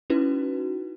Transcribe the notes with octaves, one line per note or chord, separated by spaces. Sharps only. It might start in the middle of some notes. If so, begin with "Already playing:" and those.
C#4 D#4 E4 F#4 B4